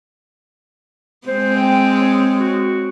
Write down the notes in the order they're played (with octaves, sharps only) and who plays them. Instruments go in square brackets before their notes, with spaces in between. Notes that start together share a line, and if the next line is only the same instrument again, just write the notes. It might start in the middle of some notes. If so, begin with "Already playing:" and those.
[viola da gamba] G#3 C4 [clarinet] C5
[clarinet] G5
C#5
F#4